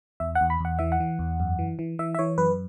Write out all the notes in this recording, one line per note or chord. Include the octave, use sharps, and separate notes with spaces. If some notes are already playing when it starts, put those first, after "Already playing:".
E2 E5
F#5
E2
B5
E2 F#5
E3 E5
F#5
E3
E2
F#2
E3
E3
E3 E5
E5
E3 C#5
F#2 B4